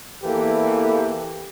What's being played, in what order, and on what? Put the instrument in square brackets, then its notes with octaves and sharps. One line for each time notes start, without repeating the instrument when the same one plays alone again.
[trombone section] E2 E3 A#3 G4 A4 B4